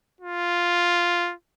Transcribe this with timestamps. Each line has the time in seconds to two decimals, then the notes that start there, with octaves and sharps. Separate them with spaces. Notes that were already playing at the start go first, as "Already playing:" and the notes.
0.21 F4